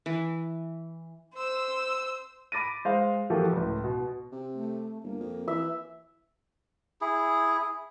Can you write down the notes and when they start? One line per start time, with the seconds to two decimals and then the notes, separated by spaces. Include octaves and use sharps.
0.06 E3
1.34 C5 E6
2.52 B5 D6 A6 A#6 D#7
2.85 G#3 C5 F5
3.30 E3 F3 A#3 F#4 G4 A4
3.53 C#2 A2
3.84 B2
4.32 C3
4.54 A3
5.03 G1 A#3
5.20 F2
5.48 E3 E5
7.01 E4 G#4